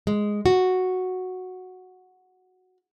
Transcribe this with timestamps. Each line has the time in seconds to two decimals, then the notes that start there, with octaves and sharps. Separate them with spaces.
0.07 G#3
0.46 F#4